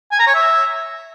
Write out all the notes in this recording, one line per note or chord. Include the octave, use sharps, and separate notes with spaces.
G#5
A#5
C#5
E5